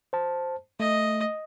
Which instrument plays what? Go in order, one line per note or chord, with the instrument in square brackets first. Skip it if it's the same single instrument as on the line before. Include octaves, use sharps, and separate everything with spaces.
[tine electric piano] C5 A5
[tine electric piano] A3 [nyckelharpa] D#5